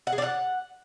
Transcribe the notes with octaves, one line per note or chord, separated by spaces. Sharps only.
F#5
G#4
D4
F#5